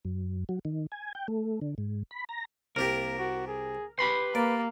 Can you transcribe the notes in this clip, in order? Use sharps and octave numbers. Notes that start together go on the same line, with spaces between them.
F#2
F#3
D#3
G#5
G5
A3
D3
G#2
B5
A#5
C2 A#3 D4 G4 A#4
F#4
G#4
G4 B4 B5 C6
A#3 D5